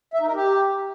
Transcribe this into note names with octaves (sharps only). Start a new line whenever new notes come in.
E5
D#4
A#4
G4